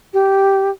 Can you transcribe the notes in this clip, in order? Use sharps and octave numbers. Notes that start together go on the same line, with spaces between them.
G4